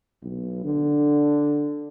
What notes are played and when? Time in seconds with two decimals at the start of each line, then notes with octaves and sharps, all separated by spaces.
0.24 B1
0.65 D3